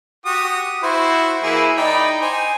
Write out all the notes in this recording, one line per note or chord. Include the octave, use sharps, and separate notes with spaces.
F#4 G4 D#6
E4 F#4 C5
E3 A#3 E4 G#4
D#4 D5 G5 B5
C5 G#5